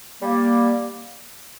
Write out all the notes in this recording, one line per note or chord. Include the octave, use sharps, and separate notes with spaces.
G3 A#3